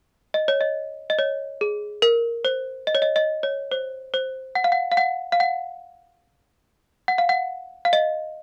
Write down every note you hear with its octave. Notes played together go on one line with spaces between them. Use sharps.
D#5
C#5
D#5
D#5
C#5
G#4
A#4
C5
D#5
C#5
D#5
D#5
C#5
C5
C5
F#5
F5
F#5
F5
F#5
F5
F#5
F#5
F5
F#5
F5
D#5